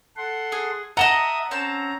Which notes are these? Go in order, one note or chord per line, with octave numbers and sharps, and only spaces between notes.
A4 F#5 C6
G#4
D#5 E5 F#5 A5 A#5 D#6 G7
C4 C#4 A5 A#5